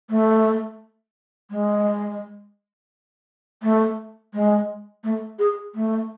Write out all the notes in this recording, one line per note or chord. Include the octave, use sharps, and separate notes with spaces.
A3
G#3
A3
G#3
A3
G#4
A3